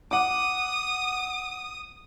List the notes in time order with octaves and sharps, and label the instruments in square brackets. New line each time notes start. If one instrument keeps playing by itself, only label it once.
[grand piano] F#5 D6 [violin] D#6